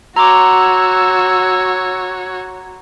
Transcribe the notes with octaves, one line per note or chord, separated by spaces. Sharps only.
F#4 C#5 A#5 C6 D6 E6